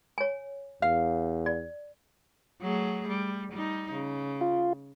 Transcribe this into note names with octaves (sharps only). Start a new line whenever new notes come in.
C#5 G#5
E2 F5
D5
F#3 A3 G#4
G3
G3 D#4
C#3
F4